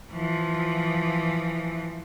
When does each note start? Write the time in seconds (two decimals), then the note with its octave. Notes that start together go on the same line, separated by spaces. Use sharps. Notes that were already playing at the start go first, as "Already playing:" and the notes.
0.12 E3 F3